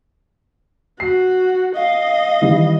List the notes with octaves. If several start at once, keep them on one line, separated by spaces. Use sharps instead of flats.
F#4 C7
D#5 F5
D#3 E3 G3